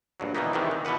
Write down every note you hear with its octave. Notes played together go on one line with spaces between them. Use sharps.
A#1 G2 F#3
B2 D#3 E3 A#3 B3 D#4
E2 C3 D#3 E3 A3 D4
D#3
B2 E3 F3 B4 F#5